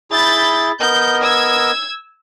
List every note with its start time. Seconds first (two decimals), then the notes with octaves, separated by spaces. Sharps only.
0.11 E4 G#4 B5 G6 A6
0.80 B3 A#4 D#5 G6
1.24 E6 G#6